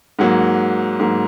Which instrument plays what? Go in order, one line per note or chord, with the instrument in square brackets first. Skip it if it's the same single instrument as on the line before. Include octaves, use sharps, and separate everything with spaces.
[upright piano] G#2 F#3 A#3 F#5
G#2 F#3 A#3